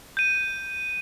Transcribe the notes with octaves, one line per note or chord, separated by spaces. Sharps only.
G6 D#7